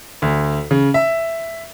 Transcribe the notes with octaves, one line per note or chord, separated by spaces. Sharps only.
D2
C#3
E5